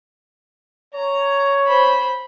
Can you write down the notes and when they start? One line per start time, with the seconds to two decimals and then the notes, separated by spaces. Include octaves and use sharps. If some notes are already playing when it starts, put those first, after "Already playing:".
0.95 C#5 A#5
1.67 C5 B5